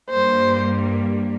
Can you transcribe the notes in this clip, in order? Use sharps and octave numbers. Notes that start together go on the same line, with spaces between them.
G2 G3 A#3 C5